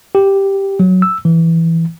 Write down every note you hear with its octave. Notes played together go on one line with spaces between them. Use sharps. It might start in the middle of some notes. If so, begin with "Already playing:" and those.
G4
F#3
E6
E3